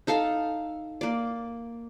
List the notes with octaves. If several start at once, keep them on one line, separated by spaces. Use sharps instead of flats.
D#4 A4 F5 A5
A#3 D5